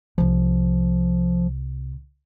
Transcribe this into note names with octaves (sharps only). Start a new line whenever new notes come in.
C2 C3 F3